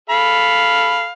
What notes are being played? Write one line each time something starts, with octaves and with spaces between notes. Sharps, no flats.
A4 F5 B5